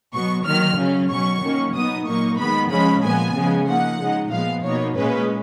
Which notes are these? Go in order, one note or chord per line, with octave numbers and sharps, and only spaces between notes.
B2 F#3 B3 C#6
D#3 F#3 A#3 F6
C#3 F#3 C#4
B2 F#3 C#4 C#6
D#3 F#3 A#3 C#4
B2 F#3 B3 D#4 D#6
A#2 F#3 A#3 D#4 C#6
D#3 G#3 B3 B5
C#3 F3 G#3 C#4 B5
A#2 F3 B3 G#5
C#3 F3 G#3 B3
F3 A#3 D#4 F#5
C#3 G#3 D#4
A#2 F3 G#3 B3 F5
B2 A#3 D#4 C#5
A#2 G#3 C#4 B4